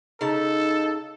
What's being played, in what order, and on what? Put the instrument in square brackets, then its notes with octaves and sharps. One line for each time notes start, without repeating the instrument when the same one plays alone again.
[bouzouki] C#3 A5 [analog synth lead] D#4 [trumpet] A4